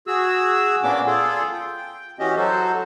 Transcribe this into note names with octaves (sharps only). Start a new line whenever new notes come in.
F#4 G#4 E6
A#2 A#3 B3 C#4 D4 D6
F4 G#4 A4
G5
E3 C#4 F#4 G4 D#5
F#3 F#4 A4 C5